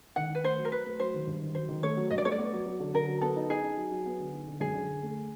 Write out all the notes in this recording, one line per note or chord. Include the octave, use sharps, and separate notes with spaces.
D#3 F#5
D#3 B4
A3 C5
F#3
A#4
F#3 B4
A3
F#3 C5
D#3
G2
D#3
F#3 C5
D#3
A3 C#5
F#3
G2 D#5
D5
A3 C#5
D5
B3
F#3
F#3
D3
D3 A#4
F#3
B3 A4
D#4
D#4 G#4
D#4
F#3
F#3
B3
D3
D#4
D3
F#2 G#4
D3
D3
A3